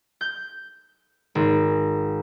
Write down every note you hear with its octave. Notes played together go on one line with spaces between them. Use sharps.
G6
G#1